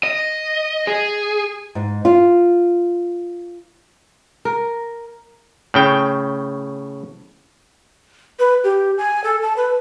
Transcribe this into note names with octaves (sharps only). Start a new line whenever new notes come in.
D#5
G#4
G#2
F4
A#4
A2 C#3 G5
B4
G4
G#5
A4
A5
B4